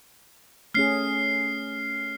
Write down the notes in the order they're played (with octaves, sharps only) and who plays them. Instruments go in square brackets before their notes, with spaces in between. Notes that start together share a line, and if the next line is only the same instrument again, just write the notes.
[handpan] A3 C#4 G#4 [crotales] F6 C7